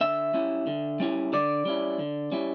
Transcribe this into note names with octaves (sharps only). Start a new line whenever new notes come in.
D3 E5
G3 C#4 E4
D3
G3 C#4 E4
D3 D5
G3 C#4 E4
D3
G3 C#4 E4